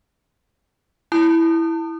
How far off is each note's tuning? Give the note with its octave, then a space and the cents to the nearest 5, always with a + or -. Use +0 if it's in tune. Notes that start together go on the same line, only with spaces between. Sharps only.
E4 +0 A5 +35 D#6 -30